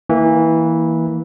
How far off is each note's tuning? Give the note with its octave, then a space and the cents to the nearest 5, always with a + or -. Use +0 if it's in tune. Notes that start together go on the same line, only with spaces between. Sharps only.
E3 -15 A#3 +0